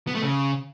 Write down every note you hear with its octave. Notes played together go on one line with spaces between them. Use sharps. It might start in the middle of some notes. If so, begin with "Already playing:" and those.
B3
A3
C#3